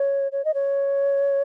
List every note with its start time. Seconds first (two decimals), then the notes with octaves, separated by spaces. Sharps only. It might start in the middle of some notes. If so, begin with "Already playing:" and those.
Already playing: C#5
0.32 C#5
0.45 D#5
0.54 C#5